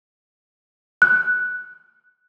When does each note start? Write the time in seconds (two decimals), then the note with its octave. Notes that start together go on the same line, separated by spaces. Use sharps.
1.02 F#6